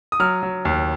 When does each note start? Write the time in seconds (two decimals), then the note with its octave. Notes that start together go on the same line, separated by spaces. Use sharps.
0.12 D#6
0.20 F#3 F6
0.43 F#3
0.65 D#2